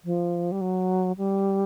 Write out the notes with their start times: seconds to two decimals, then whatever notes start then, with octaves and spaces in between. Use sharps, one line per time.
0.05 F3
0.52 G3
0.61 F#3
1.18 G3